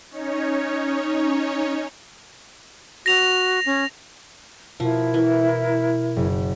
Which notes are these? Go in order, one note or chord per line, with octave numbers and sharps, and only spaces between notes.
C#4 D#4 C#5
F#4 A#6 F7
C#4
B2 F3 E4 A#4
E3
F#1